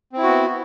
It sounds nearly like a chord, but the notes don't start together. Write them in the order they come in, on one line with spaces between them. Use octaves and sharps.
C4 E4 F#4 B3